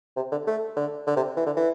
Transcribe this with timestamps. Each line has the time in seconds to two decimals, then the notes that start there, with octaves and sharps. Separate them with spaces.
0.16 C3
0.32 D3
0.47 A3
0.76 D3
1.07 D3
1.16 C3
1.37 E3
1.46 D3
1.57 E3